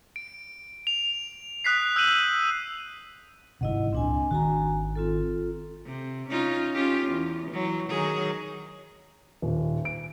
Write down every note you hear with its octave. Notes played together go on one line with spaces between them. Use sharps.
D7
F7
D#6 F#6 B6 C7
E6 G6 C7 D#7 F#7
G1 G#2 C3 E4 D#5 F#5
C#2 A#2 C4 D4 G#5
G#1 D#3 F#4 G#5 A#5
C4 F4 A4
C3
C#4 D#4 F4
C#4 F4 G4
E2
E3 F#3
D#3 F#3 G#4
D#1
D7